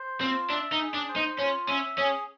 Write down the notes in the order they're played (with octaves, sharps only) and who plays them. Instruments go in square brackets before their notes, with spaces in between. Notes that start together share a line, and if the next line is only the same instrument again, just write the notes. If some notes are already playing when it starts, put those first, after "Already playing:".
Already playing: [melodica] C5
[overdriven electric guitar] C4 [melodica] F4
[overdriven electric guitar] D4 [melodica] E5
[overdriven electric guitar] D#4
[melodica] G#4
[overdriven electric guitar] D4
[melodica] C5
[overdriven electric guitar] D#4
[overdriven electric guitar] C#4 [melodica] F4
[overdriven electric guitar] C#4 [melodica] E5
[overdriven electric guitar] C#4 [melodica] G#4